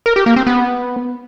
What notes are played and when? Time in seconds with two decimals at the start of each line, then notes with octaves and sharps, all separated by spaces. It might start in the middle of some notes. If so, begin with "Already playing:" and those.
0.06 A#4
0.16 G4
0.26 A#3
0.36 C4
0.47 B3